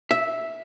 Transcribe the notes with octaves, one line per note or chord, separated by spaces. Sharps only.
E5